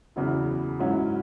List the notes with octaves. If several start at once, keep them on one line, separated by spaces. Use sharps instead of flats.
E2 C#3 F#3 B3 E4
G#2 F#3 C#4 E4